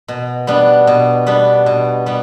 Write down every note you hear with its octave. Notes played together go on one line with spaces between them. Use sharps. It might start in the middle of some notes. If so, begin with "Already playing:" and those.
B2
G3 B3 D4
B2
G3 B3 D4
B2
G3 B3